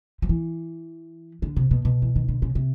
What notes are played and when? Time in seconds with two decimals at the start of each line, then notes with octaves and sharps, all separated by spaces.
0.22 F3
0.29 E3
1.42 D3
1.56 C3
1.71 B2
1.85 B2
2.02 E3
2.16 D#3
2.28 D3
2.42 C#3
2.55 C3